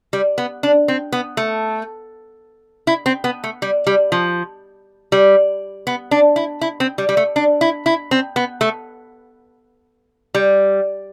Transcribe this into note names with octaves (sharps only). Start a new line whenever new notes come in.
G3
B3
D4
C4
B3
A3
E4
C4
B3
A3
G3
G3
F3
G3
B3
D4
E4
E4
C4
G3
G3
A3
D4
E4
E4
C4
B3
A3
G3